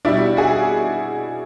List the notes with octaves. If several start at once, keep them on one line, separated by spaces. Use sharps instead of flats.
B2 G3 D4 E4
F#4 G#4